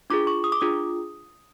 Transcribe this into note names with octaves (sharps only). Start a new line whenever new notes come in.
D4 F4 G#4 D6
C#6
D#6
D6
D4 F4 G#4 D#6